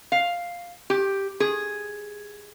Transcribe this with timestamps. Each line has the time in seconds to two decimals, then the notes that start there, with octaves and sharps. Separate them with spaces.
0.12 F5
0.90 G4
1.40 G#4